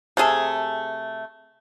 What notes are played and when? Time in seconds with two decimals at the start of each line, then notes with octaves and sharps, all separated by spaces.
0.17 C3 A3 G#4 A4